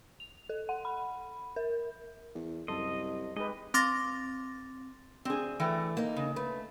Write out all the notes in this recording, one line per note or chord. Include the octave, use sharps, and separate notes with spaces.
F7
A4
F#5
B5
A#4
E2
C2 F#2 A4 D#5 C6
G#3 D#4 G4 B4 D#5
C4 C6 D6 A6 A#6
D2 C4 G#4
E3 A3 G5
A#3 D#4
C#3
A3 B4